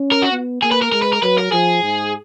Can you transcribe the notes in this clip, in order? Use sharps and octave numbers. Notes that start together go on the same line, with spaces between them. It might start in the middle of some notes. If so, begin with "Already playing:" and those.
Already playing: C#4
A#4
F#4
B3
A#3 G#4
B4
A#4
G#3 A#4
B4
A#4
F#3 B4
A#4
F3 G#4
G#2